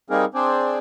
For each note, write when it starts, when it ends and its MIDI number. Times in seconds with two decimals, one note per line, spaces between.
0.10 0.25 55
0.10 0.25 58
0.10 0.25 60
0.10 0.25 63
0.10 0.25 68
0.10 0.25 70
0.34 0.79 60
0.34 0.79 62
0.34 0.79 68
0.34 0.79 72
0.34 0.79 74